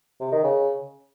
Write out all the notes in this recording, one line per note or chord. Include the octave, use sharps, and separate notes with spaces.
C3
D#3
C#3